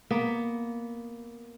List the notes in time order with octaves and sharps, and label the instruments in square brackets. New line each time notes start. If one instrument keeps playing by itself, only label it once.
[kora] A#3 B3